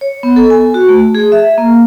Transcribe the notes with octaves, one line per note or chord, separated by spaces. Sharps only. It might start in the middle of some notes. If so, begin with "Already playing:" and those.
C#5
B3
A4
G#5
F#4
A3
G#4
E5
A#3